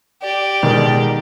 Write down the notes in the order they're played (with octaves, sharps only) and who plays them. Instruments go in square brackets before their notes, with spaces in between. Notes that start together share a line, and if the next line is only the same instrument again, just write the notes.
[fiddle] G4 [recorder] D5
[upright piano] B2 G#3 A#4 [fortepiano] D#3